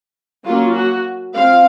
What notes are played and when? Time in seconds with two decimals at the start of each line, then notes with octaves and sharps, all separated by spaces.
0.45 F#3 A#3 C#4 F4
0.75 F#4
1.35 F3 C4 F5